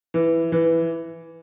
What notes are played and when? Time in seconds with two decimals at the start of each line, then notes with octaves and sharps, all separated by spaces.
0.14 E3
0.52 E3